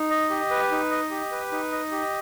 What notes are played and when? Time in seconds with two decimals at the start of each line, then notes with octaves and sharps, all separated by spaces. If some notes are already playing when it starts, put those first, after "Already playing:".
Already playing: D#4
0.10 D#5
0.30 G4
0.51 B4
0.71 D#4
0.91 D#5
1.11 G4
1.32 B4
1.52 D#4
1.72 D#5
1.91 G4